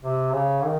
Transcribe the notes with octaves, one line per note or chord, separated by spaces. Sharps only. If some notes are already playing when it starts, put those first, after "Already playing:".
C3
C#3
D#3